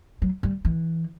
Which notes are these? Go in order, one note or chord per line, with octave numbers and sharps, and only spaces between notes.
F#3
G3
E3